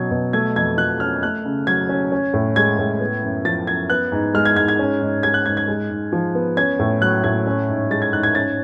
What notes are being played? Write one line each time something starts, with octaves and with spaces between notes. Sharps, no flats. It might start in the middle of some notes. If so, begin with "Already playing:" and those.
Already playing: B2 F#3 C#4 G#6
B2
A3 G#6
F2 G#6
F3 F#6
C#4 F6
A3 F#6
C#3
F#3 G#6
C#4
C#4
A2
G#3 G#6
A2
B3
F#2
F3 A6
F#2 G#6
B3 F#6
G#2
G#3 F6
G#6
G#2 G#6
G#6
C#4
G#2
G#3 G#6
F#6
G#2 G#6
G#6
G#3
G#2
F3
B3
C#4 G#6
A2
F#3 F#6
A2 G#6
C#4
G#2
G#3 A6
G#6
G#2 F#6
G#6
C#4 A6